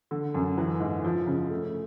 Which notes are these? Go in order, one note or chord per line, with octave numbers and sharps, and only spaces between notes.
D3
F#2
E3
G#2
F3
C#3
A3